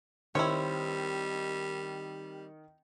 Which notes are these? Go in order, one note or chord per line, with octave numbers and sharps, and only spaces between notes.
D#3 G3 C4 E4 C#5